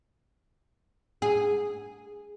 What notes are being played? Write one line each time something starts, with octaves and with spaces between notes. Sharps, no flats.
G#4